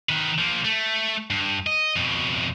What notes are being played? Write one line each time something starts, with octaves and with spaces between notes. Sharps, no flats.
D#3 B4
F3 A#3
A3
G2
D#5
F2 B2